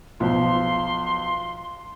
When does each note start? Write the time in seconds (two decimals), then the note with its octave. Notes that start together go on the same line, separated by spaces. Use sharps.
0.20 B1 F3 C6